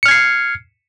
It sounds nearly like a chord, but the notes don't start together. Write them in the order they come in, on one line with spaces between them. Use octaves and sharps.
C#7 F6 G#6 C7